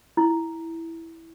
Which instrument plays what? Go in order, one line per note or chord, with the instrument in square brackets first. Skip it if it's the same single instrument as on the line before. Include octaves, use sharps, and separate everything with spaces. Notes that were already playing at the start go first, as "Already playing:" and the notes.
[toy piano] E4